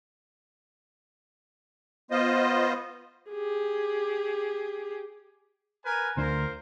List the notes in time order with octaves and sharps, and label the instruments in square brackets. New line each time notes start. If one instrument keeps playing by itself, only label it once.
[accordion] B3 F4 C5 D#5
[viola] G4 G#4
[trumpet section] A#4 B4 G#5
[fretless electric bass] D2 D4 [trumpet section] F4 A#4 C5